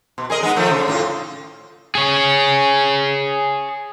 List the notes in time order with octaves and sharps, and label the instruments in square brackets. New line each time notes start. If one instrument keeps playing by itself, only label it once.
[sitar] B2
G#4 A#4 D#5
G#3 B3 D#4
D#3 F3 A3
C#3
A2 F4
[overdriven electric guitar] G#4 C#5